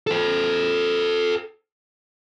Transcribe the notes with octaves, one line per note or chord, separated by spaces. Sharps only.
A4 C5